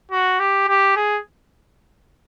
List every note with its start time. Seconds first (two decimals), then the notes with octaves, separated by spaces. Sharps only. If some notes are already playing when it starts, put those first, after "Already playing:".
0.11 F#4
0.40 G4
0.68 G4
0.96 G#4